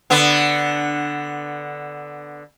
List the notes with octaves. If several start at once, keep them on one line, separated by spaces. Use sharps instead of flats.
D3 B3